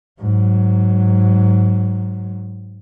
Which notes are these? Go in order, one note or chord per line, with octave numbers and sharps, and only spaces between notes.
G#2 F#3